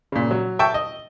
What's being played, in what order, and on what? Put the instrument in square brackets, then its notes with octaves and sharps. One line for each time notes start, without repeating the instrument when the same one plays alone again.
[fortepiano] A#2 C#3
F#3
E5 G5 A5 C#6
D#5